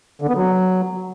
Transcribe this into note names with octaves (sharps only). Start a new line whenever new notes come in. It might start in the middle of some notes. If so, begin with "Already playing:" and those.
D3
B3
F#3